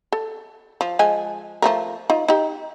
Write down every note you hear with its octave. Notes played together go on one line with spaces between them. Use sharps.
A4
F3
F3 G#3 G#5
F3 A3 A#4
D#4 F4
D#4 G4